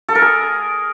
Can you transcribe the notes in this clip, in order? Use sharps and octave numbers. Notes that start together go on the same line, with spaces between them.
A4
A#4
G#4